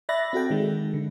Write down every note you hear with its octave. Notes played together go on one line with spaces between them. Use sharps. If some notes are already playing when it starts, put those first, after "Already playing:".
D5 E5 B5 F#6 A6 A#6
C4 F#4 A4 G5
D#3 G#3
D3